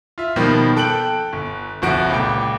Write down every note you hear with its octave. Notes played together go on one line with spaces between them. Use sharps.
F4 E5
B2 D#3 F3 G3 A#3
A4 G5 F#6 D7 F#7
G1
G1 C2 F3 F#4 D7
C#2 A#2 G5